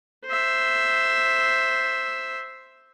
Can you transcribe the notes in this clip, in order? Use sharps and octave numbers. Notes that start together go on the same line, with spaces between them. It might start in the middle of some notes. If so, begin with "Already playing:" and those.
C5 E5